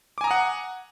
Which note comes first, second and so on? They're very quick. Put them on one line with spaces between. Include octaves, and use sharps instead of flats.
D6 G#5 A#5 D#6 F#5